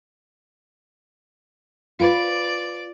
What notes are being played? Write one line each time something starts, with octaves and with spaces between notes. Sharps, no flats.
F4 B4 D5 D7